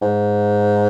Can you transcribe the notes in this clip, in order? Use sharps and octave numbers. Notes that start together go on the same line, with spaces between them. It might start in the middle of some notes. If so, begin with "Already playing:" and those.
G#2